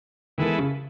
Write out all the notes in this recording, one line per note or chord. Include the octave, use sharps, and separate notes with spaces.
D#3 E3 G#3 B3 E4 A4
C#3